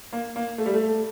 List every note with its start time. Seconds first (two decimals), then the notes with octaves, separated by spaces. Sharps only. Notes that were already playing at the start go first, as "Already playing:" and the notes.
0.13 A#3
0.36 A#3
0.58 A3
0.66 G3
0.74 A3